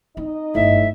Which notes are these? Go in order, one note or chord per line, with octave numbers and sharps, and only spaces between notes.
C4 D#4 D#5
G1 F#2 A2 E5